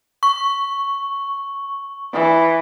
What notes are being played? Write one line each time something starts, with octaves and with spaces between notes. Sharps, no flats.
C#6
E3